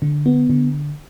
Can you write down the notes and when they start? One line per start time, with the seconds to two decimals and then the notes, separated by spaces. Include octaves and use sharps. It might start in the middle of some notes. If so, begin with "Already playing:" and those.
0.02 D3
0.26 B3
0.49 D3